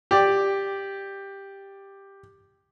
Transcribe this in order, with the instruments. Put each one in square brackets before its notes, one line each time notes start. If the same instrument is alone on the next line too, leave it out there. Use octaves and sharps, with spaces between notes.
[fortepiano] G4 D5